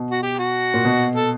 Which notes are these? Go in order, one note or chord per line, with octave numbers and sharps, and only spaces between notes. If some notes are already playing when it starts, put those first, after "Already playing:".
Already playing: B2
F#4
G4
F#4
A#2
B2
A4